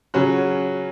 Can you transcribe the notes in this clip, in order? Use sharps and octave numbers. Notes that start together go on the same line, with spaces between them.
C#3 F#3 C#4 F#4